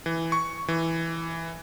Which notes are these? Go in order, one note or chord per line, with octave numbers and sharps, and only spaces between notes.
E3
C#6
E3